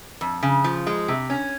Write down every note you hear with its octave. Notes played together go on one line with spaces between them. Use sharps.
F2
C#3
F3
G#3
C3
C#4